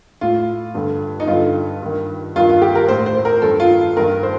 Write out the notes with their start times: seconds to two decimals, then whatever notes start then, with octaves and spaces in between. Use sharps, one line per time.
0.21 A2 F4
0.74 G2 D3
1.20 D#4
1.28 G2 F4
1.33 D3
1.82 G2 D#3
2.36 G2 D#3 F4
2.49 F4
2.62 G4
2.75 A#4
2.88 A2 C5
3.06 C5
3.25 A#4
3.42 G2 D#3 A4
3.60 F4
3.97 G2 D#3 A#4
4.23 C5